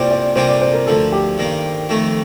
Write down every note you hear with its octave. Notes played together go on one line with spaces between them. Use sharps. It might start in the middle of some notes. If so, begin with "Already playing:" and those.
Already playing: C2 A#2 G3 C5 D5
D5
C2 A#2 G3 A#3 D4 C5
D5
C5
A#4
D2 D3 F3 A4
G4
G2 D#3 A#3
F2 D#3 A3